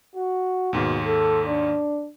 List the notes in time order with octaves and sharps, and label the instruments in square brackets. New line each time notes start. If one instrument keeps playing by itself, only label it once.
[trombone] F#4
[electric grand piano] D#2 G#2 [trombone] B2
[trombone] A4
D4